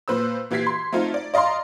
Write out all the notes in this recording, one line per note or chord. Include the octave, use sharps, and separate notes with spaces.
A#2 B4 C5 E6
A#2 E3 G4 G#6 B6 C7
C6
A3 C4 D#4 F4
D5
D5 D#5 F5 A#5 C6